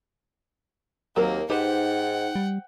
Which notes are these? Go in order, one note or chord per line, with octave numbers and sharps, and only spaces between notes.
D#2 F#3 A#3 C4 A#4
G#2 D#4 G4 B4 C5 F#5 G5
G3